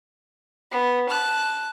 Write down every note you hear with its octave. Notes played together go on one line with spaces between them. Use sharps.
B3
A5 F#6